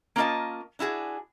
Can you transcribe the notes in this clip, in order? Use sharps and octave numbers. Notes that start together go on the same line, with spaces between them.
A#3 C#4 F4 A#4 D#5 A5
D4 E4 F#4 G#4